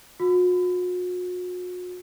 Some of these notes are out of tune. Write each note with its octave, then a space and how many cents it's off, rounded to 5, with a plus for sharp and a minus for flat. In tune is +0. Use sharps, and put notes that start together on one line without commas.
F#4 -45